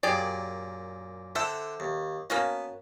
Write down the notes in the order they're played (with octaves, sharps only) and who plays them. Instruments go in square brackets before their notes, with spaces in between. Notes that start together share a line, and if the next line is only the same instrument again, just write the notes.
[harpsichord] F#2 A#2 [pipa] G4 G#4 D5
[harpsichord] D3 C5 G5 [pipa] A4 E5 F#5
[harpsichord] D#2
[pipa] A#3 C#4 F#4 [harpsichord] B3 A5